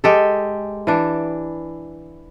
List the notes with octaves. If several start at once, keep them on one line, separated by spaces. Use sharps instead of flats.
G#3 G4 A4
E3 D4